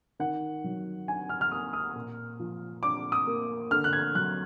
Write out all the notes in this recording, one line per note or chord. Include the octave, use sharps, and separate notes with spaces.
D#3 F#5
F#3
D4 G#5
F6
F6
A#3 D#6
D#6
A#2
F3
D4 D6
D#6
A#3
D3 F6
F#6
G#6
F#3 F#6